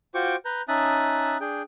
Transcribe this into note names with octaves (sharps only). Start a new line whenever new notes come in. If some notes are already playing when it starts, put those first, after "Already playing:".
F4 F#4 C5 G5 C#6 D6
B4 A#5 G6
C#4 D#4 E5 A5 D#6 F#6
D4 G#4 G5